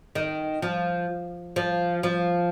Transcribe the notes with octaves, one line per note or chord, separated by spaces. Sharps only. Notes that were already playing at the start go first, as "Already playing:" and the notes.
D#3
F3
F3
F3